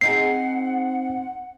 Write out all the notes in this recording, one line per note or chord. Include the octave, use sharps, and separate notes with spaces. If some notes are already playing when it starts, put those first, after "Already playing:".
C4 D#4 G#4 F#5 C7